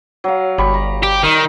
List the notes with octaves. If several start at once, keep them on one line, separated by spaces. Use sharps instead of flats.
F#3 F5
G1 G3 B5 C#6
A#5
G4
D#3 D#4